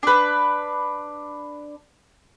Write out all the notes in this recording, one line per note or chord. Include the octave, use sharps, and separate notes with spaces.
D4 B4